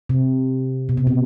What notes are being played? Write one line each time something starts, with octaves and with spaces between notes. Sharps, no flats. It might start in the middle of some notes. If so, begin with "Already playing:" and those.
C3
B2
C3
B2